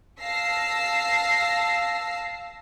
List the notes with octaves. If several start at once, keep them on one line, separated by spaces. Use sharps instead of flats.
F5 A5 E6 A#6 C7